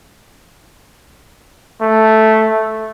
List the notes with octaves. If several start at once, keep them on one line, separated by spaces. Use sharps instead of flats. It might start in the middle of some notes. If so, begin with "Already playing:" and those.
A3